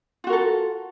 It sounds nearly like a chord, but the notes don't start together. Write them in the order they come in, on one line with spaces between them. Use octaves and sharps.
F4 F#4 A#4 A4